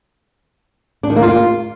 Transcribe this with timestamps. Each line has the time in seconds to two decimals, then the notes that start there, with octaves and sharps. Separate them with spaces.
1.03 D4
1.10 D#3
1.16 A#3
1.23 F4